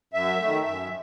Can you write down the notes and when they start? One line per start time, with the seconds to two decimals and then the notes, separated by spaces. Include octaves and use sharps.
0.14 F#2 E5
0.40 D#3 A3
0.67 F#2